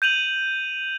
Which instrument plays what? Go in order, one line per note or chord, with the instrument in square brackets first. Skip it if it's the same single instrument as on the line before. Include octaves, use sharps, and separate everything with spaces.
[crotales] G6 D#7 F7 F#7